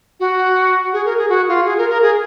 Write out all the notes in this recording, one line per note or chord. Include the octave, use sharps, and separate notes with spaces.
F#4
G#4
A#4
G#4
F#4
F4
G#4
A#4
A#4
G#4